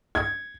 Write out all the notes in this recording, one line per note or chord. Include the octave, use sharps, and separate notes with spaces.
G#6